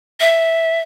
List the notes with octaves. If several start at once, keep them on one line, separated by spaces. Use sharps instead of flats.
E5